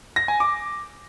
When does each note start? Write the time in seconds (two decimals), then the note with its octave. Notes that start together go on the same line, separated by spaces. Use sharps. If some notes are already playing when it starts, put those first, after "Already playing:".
0.16 A#6
0.28 G#5
0.40 D6